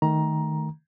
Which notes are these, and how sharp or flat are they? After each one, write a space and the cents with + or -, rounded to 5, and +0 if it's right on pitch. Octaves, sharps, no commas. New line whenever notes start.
D#3 +0 A3 +0 A#5 +15